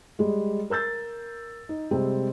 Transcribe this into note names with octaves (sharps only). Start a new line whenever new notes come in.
G3 G#3
A#4 E6 G6 A6
D#4
C3 G3 G#3 C4